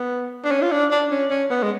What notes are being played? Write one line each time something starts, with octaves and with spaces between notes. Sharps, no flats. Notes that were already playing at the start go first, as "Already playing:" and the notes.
Already playing: B3
D4
C#4
F4
D4
D4
C#4
C#4
B3
G#3